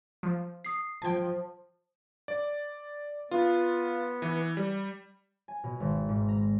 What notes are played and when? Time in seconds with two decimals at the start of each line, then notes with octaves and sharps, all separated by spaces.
0.23 F3
0.65 D#6 C7
1.02 F3 G5 A5 G#6
2.28 D5
3.31 B3 F4
4.22 E3
4.57 G3
5.48 G#5
5.64 B2
5.80 G#1
6.09 G#2
6.28 A#5